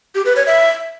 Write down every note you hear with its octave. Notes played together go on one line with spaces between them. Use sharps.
G4
B4
C#5
E5